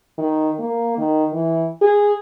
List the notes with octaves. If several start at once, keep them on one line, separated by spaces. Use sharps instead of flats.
D#3
A#3
D#3
E3
G#4